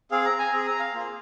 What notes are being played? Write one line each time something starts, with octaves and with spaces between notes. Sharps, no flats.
C4 G#4 F5
A#5
G#5
C4 G#4 A#5
A#5
F5
A#3 F4 G#4